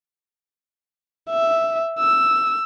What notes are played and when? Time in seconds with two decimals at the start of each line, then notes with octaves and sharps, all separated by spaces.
1.30 E5
1.99 E6